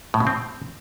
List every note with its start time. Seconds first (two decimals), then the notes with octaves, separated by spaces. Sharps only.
0.14 A2
0.20 B2
0.27 C4